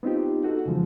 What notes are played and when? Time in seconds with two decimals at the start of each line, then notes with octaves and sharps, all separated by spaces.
0.03 B3 C4 D#4 F4 G4
0.43 D#4 F#4 A4
0.65 F2 C#3 E3 F3 G#3